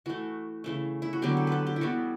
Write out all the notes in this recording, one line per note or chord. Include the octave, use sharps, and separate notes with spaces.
E3 A3 F#4
C#3 E3 A3
E4
F#4
D3 F#3 B3 G4
A4
A4 B4
G4
E4
E3 G3 B3 F#4